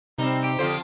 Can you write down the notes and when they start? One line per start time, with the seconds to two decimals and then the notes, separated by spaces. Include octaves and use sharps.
0.18 C3 G3 C4 D#4
0.44 G4
0.59 F2 D3 F3 F4 C5